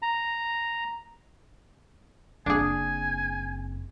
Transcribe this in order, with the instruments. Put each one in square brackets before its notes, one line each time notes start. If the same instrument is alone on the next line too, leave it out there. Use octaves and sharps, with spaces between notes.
[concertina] A#5
[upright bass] F#1 C4 [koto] D4 G#4 [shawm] G#5